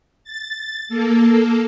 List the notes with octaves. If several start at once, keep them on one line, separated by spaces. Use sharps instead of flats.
A6
A#3 A4